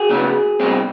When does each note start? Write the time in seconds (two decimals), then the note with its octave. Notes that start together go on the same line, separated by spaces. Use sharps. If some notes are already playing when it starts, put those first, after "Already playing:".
Already playing: F#4 G#4
0.09 C#2 C#3 F#3 B3
0.60 C2 B2 G#3 C4